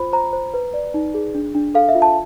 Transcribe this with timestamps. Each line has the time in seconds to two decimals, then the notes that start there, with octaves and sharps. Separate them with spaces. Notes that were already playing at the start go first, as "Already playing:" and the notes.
Already playing: F4 C5 B5
0.13 C5 A#5
0.33 C5
0.54 B4
0.74 D5
0.94 D#4
1.14 G#4
1.35 D4
1.55 D4
1.74 A4 F5
1.89 E5
1.95 F4
2.02 A5